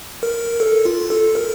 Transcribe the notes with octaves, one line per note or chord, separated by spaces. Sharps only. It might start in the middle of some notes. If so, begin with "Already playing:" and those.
A#4
A4
F4
A4
A#4